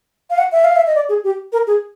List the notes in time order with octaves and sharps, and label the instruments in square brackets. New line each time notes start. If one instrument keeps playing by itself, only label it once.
[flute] F5
F#5
E5
F5
E5
D#5
D5
G#4
G4
A#4
G#4